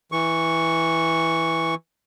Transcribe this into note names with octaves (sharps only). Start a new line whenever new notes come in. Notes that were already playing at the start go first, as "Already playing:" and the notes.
E3 C#6